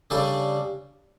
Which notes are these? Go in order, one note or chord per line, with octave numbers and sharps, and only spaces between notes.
C#3 G3 D4 A4